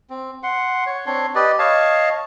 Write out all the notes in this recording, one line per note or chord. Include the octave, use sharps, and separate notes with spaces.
C4
F#5 C6
C#5
C4 D4 C#5 C6
G4 B4 D5 D#5
C#5 D#5 F5 A5